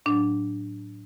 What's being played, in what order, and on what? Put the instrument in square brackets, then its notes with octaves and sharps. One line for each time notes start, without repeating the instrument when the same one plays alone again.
[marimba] A2 F#3 D4